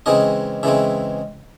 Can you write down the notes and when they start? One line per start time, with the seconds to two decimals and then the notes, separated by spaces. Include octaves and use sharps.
0.06 C#3 E3 G#3 C4 D#5
0.63 C#3 E3 G#3 C4 E5